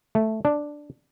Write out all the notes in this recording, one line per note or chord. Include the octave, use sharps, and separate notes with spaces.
A3
D4